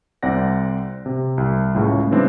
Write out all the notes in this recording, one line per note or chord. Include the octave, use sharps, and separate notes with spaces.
C2 C4 D5 F#5 A#6
C3
C2
C#2 A2 C#3
C#3 E3 G3 G#3 C4 D4